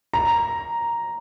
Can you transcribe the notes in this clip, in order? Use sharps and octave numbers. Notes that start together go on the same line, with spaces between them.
A#5